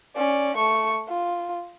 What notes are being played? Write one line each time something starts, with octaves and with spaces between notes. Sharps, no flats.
C#4 D5
A3 C#6
F4